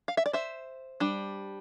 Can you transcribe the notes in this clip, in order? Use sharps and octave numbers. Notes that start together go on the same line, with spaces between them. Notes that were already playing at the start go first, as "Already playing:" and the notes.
F5
E5
D5
C5 E5
G3 D4